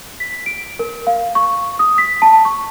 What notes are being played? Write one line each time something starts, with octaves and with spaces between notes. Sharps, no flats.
B6
D7
A#4
F5
C#6
D#6
B6
A5
C#6